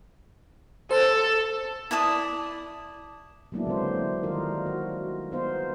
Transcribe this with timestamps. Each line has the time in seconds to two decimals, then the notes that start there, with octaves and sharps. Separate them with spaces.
0.91 A4 C5
1.91 E4 D5 A5 D#6
3.52 F#3 G#3 A#3 B3 D4 E4
3.67 D3 C4 C5
4.23 D#3 G3 D#4 F4 A#4
4.66 F#4
5.31 B3 D#4 C5 F5